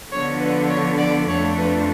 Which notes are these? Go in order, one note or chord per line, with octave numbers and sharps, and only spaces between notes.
D3 F3 B3 D4 C#5
B4
C#5
D5
F2 F3 A3 D4 C#5
B4